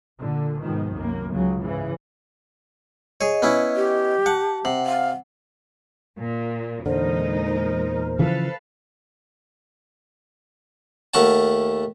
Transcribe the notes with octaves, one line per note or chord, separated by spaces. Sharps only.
A#2 D3
G#2 B2 D#3 F3
C2 F#2 A#3
C#2 C#3 F#3
G#2 C#3 E3
G#4 C#5 D#5
B3 C#4 E4
G4
F#5 A5
C3 F#5
F5 F#5
A#2
E2 A#2 D3 E3 G#3 D#4 A#4 C5
C5
C#3 E3 F3 A4 B4 F5
D#2 A3 A#4 F#5 A5